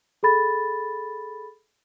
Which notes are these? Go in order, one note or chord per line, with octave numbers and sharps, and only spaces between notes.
G#4 A4 B5 A6